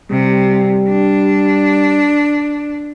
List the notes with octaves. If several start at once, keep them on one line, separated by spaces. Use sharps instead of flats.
C3 G3
D4